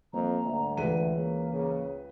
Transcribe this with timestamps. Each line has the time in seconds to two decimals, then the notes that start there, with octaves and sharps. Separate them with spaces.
0.13 F2 G3 A#3 B3 A#5
0.45 D2
0.77 C#2 E3 B4 D#7
1.15 C#3 A#3
1.52 C#3